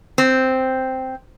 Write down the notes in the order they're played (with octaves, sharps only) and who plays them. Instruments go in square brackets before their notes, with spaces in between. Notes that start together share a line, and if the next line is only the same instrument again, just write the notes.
[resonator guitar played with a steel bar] C4